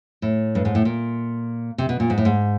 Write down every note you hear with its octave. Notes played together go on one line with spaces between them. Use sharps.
A2
G2
G#2
A2
A#2
C3
B2
A#2
G#2
A2
G#2